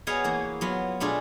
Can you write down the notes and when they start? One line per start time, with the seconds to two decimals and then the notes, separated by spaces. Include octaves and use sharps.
0.07 B3 F#4 G#4 C#5 D#5 F5
0.24 E3 A#3
0.61 F#3 B3 F4
1.00 B2 A3 D4 F4 G#4